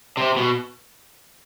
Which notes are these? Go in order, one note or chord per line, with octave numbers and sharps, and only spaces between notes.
C3
B2